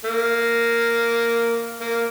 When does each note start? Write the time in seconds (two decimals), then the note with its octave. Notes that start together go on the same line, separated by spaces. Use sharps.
0.05 A#3
1.81 A#3